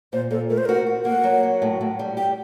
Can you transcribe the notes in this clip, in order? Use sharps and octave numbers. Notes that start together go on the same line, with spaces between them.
A#2 C5
A#2 A4
A3 A#4
C5
F#4 A#4
F#4
A#3 F#5
F#3
F#4
A2
A2
G3
G4 G5